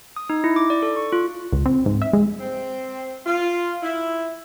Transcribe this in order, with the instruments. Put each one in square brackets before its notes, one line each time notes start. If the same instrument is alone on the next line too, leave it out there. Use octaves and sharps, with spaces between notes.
[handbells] D#6
D#4
E4
D6
D5
A4
C#6
F4
[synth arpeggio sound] C#2
C4
G#2
E5
G#3
[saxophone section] C4
F4
E4